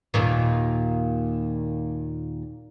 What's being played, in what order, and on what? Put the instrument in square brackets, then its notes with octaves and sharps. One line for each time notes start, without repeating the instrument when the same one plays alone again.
[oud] D#2 A#2 D#3